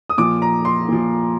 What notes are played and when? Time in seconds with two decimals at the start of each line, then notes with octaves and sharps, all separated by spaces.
0.10 D#6
0.18 A#2 F3 D6
0.42 A#5
0.65 C6
0.89 A#2 F3